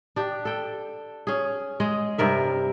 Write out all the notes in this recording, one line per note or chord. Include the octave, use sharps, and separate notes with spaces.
D4 G4
A4 G5
C#4 G#4
G#3 G#4 D#5
G2 C3 A#4 E5